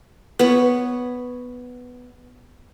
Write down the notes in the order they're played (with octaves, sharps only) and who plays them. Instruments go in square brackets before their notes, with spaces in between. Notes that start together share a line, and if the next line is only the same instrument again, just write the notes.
[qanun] B3 C#5